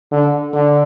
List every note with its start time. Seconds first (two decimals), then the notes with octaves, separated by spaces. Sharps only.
0.12 D3
0.54 D3